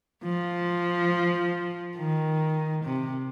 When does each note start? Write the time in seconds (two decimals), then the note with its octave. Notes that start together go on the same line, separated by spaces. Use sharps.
0.23 F3
1.97 D#3
2.84 C3